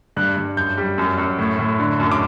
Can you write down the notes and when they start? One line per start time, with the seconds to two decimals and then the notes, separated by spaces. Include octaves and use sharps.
0.16 G2 F#6
0.37 G2
0.57 F#2 G6
0.78 G3
0.98 F#2
1.18 F#2
1.39 A2
1.59 A2
1.79 D3
2.00 F#2
2.11 D6